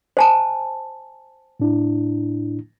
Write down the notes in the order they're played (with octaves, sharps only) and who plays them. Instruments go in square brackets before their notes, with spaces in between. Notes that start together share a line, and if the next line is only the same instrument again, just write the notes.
[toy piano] C5 G#5 A5
[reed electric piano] A2 D4 E4